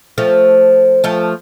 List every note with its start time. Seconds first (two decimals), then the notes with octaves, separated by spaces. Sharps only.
0.18 F3 A3
1.04 F3 A3